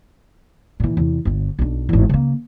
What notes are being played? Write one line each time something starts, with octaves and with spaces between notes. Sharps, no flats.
A#2 E3
E2 C3
G1 F4
B1 D4
G#1 E2
C#3 A#3